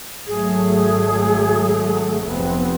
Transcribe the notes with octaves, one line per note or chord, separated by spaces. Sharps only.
G#1 F#3 A3 G#4
F1 B3 C4